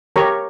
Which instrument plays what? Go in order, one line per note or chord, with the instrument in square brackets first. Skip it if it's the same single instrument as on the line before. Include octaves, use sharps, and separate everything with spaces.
[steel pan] G4 A#4 C#5 A#5 C#6